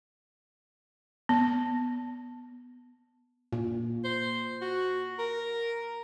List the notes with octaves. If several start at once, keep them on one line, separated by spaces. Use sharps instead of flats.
B3
A#2
C5
F#4
A#4